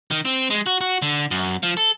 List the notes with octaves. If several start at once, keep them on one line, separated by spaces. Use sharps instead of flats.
D#3
C4
G#3
F#4
F#4
D3
F#2
F3
A4